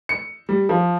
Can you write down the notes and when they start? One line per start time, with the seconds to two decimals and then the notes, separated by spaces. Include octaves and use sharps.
0.09 C#7
0.49 G3
0.69 F3